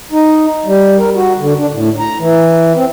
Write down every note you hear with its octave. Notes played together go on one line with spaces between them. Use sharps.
D#4
G3
A#4
F#4
D3
D4
A2
A#5
E3
C4